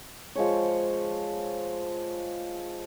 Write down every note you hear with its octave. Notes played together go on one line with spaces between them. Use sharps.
F3 G#3 C#5